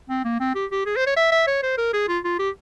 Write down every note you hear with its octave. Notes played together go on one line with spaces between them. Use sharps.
C4
A#3
C4
G4
G4
G#4
C5
C#5
E5
E5
C#5
C5
A#4
G#4
F4
F4
G4